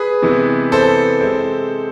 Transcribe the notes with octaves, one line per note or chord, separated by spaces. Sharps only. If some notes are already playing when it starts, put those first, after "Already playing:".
Already playing: G#4 B4
C3 E3 G#3 B3
A4 C5
C3 G#3 C4